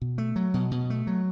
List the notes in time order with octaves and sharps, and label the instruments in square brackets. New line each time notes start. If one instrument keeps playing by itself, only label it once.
[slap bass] B2
A3
F#3
B2
B2
A3
F#3